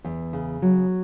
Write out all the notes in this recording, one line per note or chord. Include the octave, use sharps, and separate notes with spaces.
E2
C#3
F#3